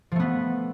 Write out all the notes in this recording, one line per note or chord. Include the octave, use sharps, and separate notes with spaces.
F3 A3 B3